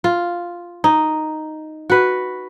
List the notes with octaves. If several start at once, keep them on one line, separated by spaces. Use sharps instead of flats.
F4
D#4
F#4 B4